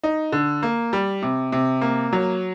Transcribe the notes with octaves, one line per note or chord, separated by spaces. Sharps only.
D#4
D3
A#3
G3
C3
C3
A#3
F#3